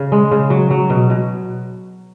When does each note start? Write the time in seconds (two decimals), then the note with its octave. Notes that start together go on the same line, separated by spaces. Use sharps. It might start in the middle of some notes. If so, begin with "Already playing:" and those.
Already playing: C#3
0.12 G#3
0.31 C#3
0.50 F#3
0.71 F#3
0.90 B2
1.10 B2